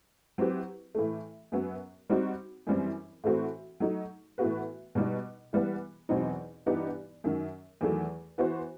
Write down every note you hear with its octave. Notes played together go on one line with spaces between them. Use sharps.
F#3 C4 E4 G4 B4
A2 E3 A3
F#2 F#3 B3
G3 C4 D#4 F#4
F#2 E3 G3 C4 E4
A2 E3 A3 C4 F#4
F#3 A3 D#4
A2 E3 B3 F#4 B4
B2 G3 D#4
E3 G3 B3
E2 B2 F#3 C4 D#4
G2 E3 B3 D#4 G4
F#2 D#3 F#3
E2 D#3 F#3 A3
E3 B3 F#4 C5